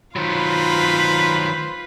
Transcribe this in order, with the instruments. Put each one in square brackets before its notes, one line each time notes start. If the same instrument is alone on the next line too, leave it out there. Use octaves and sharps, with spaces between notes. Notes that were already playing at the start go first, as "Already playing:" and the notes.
[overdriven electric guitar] D#3 F#3 [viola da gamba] F4 B4 [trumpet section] C5 B5